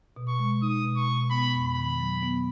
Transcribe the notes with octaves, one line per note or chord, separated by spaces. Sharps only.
B2
C#6
G#3
D#4 D#6
B2
C#6
B2
B3 B5
F2
B5
D#3
F#3
B3